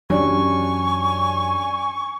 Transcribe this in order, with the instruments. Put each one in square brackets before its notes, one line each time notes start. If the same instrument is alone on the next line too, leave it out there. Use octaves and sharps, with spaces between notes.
[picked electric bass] F#2 E3 F#3 [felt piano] C#4 D4 G4 [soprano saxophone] G#5 [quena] C#6